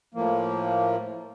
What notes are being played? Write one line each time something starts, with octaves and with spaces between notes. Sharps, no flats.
A2 F3 A#3